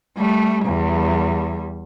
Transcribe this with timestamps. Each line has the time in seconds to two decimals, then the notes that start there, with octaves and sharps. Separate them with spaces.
0.17 G3 A3
0.66 E2 G3